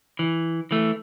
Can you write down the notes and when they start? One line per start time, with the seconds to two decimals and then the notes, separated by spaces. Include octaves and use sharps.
0.19 E3
0.71 E3 A3